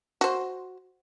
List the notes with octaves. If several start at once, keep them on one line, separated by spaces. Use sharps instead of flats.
F#4 C5